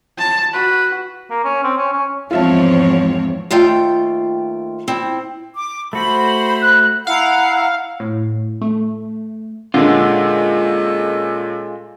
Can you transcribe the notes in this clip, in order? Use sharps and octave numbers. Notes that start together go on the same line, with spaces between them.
A5
F#4 B4
A#3
C#4
C4
C#4
C#4
E2 G#2 F3 C4 F4 C#5 E5 A5
D#2 A3 F4 G5
C4 E4
D6
A3 F#4 C5 B5
F#6
E4 F5 F#5 A#5
A2
A3
A#2 D3 G#3 C#4 F4 A4